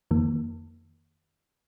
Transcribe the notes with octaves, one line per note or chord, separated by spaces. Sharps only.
F2 D#3 A#3